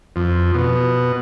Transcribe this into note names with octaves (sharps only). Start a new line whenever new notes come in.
F2
B2